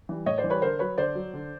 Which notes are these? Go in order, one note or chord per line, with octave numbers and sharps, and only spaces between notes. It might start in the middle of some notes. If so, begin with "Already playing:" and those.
E3 G3
A2 C#5 D#5
C5 D5
E3
G3 B4 C#5
D3 A#4 C5
F#3 B4 C#5
D3 C5 D5
F#3
D3